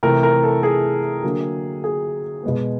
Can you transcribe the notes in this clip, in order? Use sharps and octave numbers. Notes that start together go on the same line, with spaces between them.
C3 E3 A3 A#4
A#4
A4
G#4
D3 F#3 A#3
G#4
B2 G#3 B3